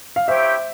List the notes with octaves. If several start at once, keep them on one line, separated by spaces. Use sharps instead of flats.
F5
E4 G4 C5 C#5 E5 G5